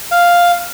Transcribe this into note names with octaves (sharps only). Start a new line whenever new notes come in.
F5